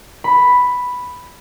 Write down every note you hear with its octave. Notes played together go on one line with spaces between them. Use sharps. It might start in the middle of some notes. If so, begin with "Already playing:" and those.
B5